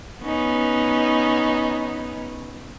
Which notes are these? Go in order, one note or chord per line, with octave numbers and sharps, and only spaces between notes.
B3 C#4 D#4